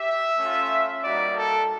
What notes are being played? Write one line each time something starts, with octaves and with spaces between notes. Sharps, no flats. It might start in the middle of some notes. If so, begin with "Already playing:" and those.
Already playing: G4 E5
A3 C#4 F4
G3 A#3 D#4 F#4 D5
A4